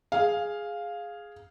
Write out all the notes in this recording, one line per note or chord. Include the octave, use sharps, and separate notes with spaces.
G#4 F5